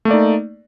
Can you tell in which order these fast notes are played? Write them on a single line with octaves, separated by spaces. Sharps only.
A3 A#3 D5 D#4